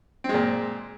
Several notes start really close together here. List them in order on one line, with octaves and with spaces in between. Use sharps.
C4 G#3 A#2